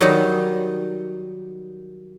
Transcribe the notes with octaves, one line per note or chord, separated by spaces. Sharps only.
D#3 F#3 G3 D#4